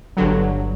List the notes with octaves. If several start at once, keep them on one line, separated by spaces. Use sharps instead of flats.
G1 G2 D3 F#3